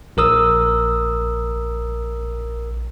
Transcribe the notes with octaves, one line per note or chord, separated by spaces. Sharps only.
A#1 A#4 D#6 E6